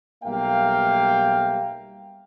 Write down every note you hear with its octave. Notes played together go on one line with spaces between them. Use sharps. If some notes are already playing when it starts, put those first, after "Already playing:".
B1 G3 A#3 E5 F5 G5